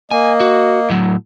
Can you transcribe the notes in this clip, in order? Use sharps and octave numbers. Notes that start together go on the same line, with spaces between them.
A#3 D#5 G#5
F#4
A2 F#3